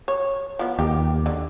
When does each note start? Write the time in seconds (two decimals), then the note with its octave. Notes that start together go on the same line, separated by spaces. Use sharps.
0.08 C#5
0.59 F3 B3
0.79 D#2 G4
1.26 D3